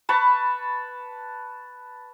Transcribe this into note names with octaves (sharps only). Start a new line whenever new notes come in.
B4 A5 B5 C#6